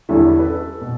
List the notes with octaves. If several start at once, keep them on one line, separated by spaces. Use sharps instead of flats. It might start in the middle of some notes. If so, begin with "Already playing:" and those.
E2 D3 G3 C#4 E4 A4
B4
A4
B2